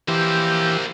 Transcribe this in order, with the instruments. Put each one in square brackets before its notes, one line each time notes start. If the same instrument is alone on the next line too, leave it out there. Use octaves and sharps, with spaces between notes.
[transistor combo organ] E3 G4 [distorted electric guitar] A#3 C5